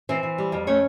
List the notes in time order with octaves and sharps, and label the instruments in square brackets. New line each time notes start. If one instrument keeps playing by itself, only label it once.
[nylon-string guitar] E3 C4 C5
E3
G3
F2
A3 C#4 C#5